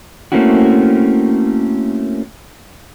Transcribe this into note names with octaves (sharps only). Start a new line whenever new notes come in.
A3 A#3 C4 C#4 E4 F#4